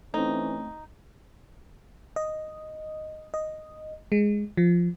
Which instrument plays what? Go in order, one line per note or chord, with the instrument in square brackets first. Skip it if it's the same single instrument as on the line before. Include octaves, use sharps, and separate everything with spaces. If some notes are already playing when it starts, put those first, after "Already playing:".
[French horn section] E3 C#4 [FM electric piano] A3 C4 [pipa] D#4
[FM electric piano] D#5
D#5
G#3
F3